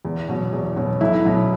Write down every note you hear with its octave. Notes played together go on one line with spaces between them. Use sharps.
E2
B2 F#3
E2
B2 F#3
B1 E4
B2 F#3